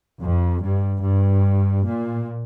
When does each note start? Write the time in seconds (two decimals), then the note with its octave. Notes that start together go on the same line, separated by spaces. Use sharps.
0.20 F2
0.62 G2
1.02 G2
1.85 A#2